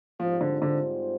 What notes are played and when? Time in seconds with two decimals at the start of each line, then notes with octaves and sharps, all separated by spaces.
0.20 G#2 F3 G3 C4 F4 C5
0.41 D3
0.62 D3